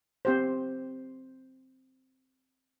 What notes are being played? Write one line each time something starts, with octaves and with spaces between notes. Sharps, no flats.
C4 G4 C5